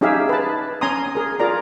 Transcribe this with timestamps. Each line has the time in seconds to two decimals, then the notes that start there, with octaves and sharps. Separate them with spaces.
0.01 C#4 D#4 G4 G#4 E5 F5
0.29 B4 A5
0.81 C#4 G#5 A#5 C6 D#6
1.15 G#4 A#4
1.40 F4 A#4 D5 A#5